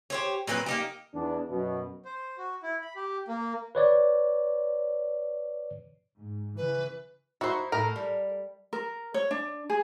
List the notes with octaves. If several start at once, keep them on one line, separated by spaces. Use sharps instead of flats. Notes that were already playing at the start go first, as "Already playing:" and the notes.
G4 C5 C#5
A#2 F#3 C4 B4
A#3 D#4 G4
E2 D4
F#2 B2
C5
F#4
E4
B5
G4
A#3
B4 C#5 D5
G#2
C#3 E3 B4
D#4 E4 F#4 C5
A2 A#4
G3
A#4
C#5
D4
G#4